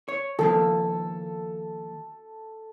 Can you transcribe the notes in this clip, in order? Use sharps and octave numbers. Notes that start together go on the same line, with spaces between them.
C#5
D#3 F3 A#3 A4